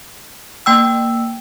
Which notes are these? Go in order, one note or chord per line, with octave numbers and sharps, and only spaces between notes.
A#3 G5 E6